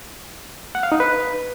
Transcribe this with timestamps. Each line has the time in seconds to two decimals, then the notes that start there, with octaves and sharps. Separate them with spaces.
0.75 F#5
0.83 F5
0.92 D#4
1.00 B4